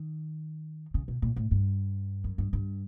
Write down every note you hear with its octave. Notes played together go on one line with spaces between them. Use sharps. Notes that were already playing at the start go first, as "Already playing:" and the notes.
Already playing: D#3
C#3
B2
A#2
A2
G2
F#2
G2
G2